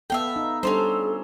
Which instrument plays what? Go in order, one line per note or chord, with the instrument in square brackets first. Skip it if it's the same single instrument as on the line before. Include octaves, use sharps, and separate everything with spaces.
[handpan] B3 A4 [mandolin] E5 F5 G5
[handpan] D#4
[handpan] G3 D4 [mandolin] C#4 F4 C5 [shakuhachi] A4